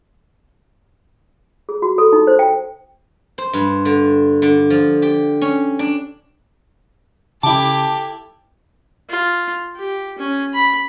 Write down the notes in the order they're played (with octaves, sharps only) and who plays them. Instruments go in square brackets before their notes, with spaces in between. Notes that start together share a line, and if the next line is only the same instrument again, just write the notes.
[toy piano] G#4
F#4
A4
D#4
C5
G5
[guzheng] C5
G2
D3
D3
F3
G4
C#4
D4
[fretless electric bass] C#3 [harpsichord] E4 D6 [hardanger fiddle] G4 A4 [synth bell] A5
[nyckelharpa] F4
G4
C#4
B5